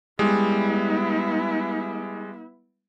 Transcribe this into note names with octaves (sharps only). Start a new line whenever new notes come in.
G3 G#3 B3 E4